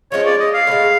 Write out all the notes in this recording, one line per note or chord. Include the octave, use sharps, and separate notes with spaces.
F3 G#3 C#4 C#5
D5
D#5
F5
A2 F3 G#3